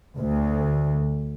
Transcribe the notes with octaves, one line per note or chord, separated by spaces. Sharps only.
D2